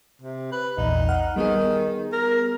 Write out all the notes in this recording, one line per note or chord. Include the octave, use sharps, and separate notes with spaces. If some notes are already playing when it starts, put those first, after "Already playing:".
C3
B4
A#1 E2 D#4
F#5 F6
D#3 G3 B3 G#4
A#4